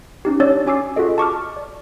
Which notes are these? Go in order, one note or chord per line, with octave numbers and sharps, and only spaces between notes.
C#4 D#4 G4
C#4 D4 C#5 D5 E6 A6
C#4 F#4 G#5 D6 E6 C7
F4 F#4 G#4 A4 D#5
A5 C#6 D6 F6
D5